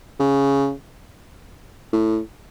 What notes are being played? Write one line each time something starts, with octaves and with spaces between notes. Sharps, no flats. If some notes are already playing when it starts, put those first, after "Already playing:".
C#3
A2